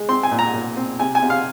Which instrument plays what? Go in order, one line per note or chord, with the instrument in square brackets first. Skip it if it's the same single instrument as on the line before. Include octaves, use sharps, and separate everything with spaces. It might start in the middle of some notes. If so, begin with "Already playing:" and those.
Already playing: [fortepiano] G#3
C4 C6
G#5
A#2
A#5
A#2
C4
C3 G#5
G#5
C3
F5